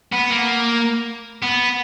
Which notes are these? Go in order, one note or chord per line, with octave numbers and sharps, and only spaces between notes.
B3
A#3
B3